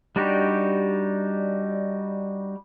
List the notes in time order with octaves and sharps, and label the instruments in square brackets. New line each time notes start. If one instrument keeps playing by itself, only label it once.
[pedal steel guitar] G3 D4 D#4 F#4 G4